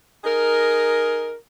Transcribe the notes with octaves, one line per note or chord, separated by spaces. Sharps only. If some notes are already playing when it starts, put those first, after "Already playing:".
D#4 G#4 A#4